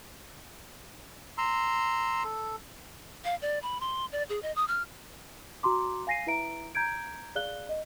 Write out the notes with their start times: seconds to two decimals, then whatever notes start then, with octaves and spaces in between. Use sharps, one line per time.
1.38 A#5 C6 E6
2.24 A4
3.25 F5
3.42 D5
3.63 B5
3.80 C6
4.12 D5
4.29 G#4
4.42 D#5
4.56 D#6
4.68 F6
5.63 F#4 A#5 C6 D6
6.07 F5 G#5 A#6 C7 D#7
6.27 E4 B4 E5 A#5 D7
6.75 A#5 G6 G#6 D7
7.35 G#4 D5 F5 F#6 G7
7.69 D#5